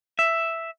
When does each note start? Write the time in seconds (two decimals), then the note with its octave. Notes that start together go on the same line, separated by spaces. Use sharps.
0.19 E5